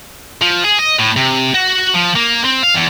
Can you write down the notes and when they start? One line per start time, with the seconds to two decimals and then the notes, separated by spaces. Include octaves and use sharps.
0.42 F3
0.64 G#4
0.79 D#5
0.99 A2
1.17 C3
1.54 F#4
1.94 F3
2.16 A#3
2.45 C4
2.63 F5
2.75 E2